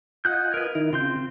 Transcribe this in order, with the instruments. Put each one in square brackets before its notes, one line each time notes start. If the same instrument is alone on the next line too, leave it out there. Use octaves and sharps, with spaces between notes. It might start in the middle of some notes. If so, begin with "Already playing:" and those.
[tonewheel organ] F4 D#5 G#5 [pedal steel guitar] F#5 F#6 G6
[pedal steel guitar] A#4 B4
[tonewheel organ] D#3 D#4 E4 [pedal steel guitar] A#4
[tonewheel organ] C#3 F4 [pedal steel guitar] C4 C6 G6